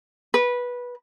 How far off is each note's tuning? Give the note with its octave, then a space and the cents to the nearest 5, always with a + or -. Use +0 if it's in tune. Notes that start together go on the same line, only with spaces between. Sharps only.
B4 -15